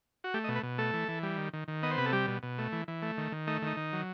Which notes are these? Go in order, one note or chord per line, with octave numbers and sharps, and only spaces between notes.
F#4
A3 G4
D#5
B2
B4
B2
A3 A4
E3
E3
G3
D#3
D#3
D#3
B3 D#5
C5
C3 B4
A4
G3 G4
B2
B2
A3
E3
E3
A3
D#3
D#3
A3 D#4
D#3 D#4
D#3
F#3